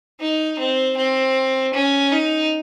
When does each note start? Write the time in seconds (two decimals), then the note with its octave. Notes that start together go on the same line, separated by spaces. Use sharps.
0.20 D#4
0.59 C4
0.97 C4
1.74 C#4
2.12 D#4